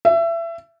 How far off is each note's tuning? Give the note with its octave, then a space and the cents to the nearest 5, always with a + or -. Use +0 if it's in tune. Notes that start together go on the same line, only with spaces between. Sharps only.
E5 +25